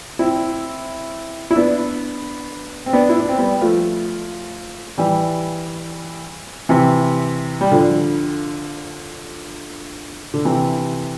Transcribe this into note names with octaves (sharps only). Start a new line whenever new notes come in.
C4 E4
E4
B3 D4
C4
B3 D4
E4
D4
C4
G3 B3
F3 A3
E3 G3
C3 E3
G3
D3 F3
D3
C3 E3